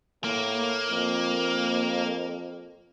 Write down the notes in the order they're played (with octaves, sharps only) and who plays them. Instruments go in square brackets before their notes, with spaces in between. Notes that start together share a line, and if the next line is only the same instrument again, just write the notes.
[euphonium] A2 [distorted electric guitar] A#3
[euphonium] F2